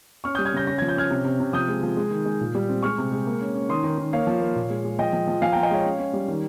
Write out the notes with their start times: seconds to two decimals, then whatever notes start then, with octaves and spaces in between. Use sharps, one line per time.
0.24 C#4 C#6 F6
0.35 G3 D#6 G6
0.45 F6 G#6
0.53 C#3 G6 A#6
0.67 C#4 A#6
0.78 F3 G#6
0.88 G6
0.96 C#4 F6 G#6
1.10 C3
1.25 C3
1.40 C3
1.53 F3 D#6 G6
1.68 G#3
1.83 F3
1.97 G#3
2.11 D#3
2.26 G#3
2.41 A#2
2.55 G3
2.69 C4
2.83 G#3 C#6 F6
2.98 C3
3.12 G#3
3.26 A#3
3.41 C#4
3.55 C#4
3.69 D#3 C6 D#6
3.84 D#3
3.98 D#3
4.13 A#3 C#5 F5
4.27 F3
4.41 A#3
4.55 A#2
4.70 G#3
4.84 G#3
4.99 F3 D#5 G5
5.13 F3
5.27 F3
5.42 F3 F5 G#5
5.52 G5 A#5
5.56 F3
5.63 D#5 G5
5.71 G#3 C#5 F5
5.85 C#4
5.99 C#4
6.13 G3
6.28 D#3